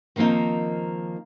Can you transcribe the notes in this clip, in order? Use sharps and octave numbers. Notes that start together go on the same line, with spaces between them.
D#3 F3 A#3 C4 D#4